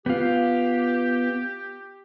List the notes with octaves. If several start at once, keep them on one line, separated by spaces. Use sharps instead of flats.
B3 F4 G4